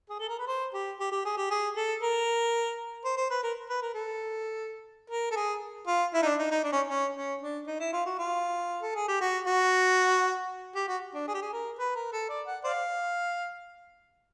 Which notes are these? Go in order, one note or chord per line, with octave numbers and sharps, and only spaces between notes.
G#4
A4
A#4
B4
C5
G4
G4
G4
G#4
G4
G#4
A4
A#4
C5
C5
B4
A#4
B4
A#4
A4
A#4
A4
G#4
F4
E4
D#4
D4
D#4
D#4
D4
C#4
C#4
C#4
D4
D#4
E4
F4
F#4
F4
A4
G#4
G4
F#4
F#4
G4
F#4
D4
G#4
G4
G#4
A#4
B4
A#4
A4
D5
F#5
C5 D5 F5